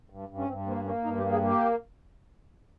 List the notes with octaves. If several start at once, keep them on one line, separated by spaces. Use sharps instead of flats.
G2
G2
C#4
G2 C4
A#3 C4
A#3 C#4
G2 D#4
G4
A#3
G#4
A#3 G4